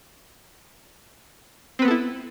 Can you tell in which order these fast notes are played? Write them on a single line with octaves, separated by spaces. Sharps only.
C4 B4 B3 A4 E4